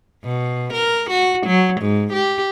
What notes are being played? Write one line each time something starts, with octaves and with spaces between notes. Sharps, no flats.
B2
A#4
F#4
F#3
G#2
G4